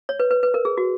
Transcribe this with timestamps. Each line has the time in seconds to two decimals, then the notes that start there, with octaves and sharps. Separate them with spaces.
0.09 C#5
0.20 B4
0.31 B4
0.43 B4
0.54 A#4
0.65 G#4
0.78 F#4